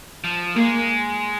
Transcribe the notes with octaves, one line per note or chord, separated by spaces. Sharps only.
F3
G#3 A#3